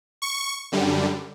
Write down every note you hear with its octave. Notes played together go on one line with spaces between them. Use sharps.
C#6
F#2 D3 G3